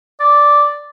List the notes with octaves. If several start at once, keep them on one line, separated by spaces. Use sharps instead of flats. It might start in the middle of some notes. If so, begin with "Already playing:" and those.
D5